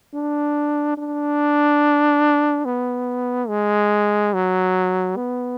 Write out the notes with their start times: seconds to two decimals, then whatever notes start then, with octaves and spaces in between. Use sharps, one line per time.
0.14 D4
0.97 D4
2.65 B3
3.49 G#3
4.34 F#3
5.16 B3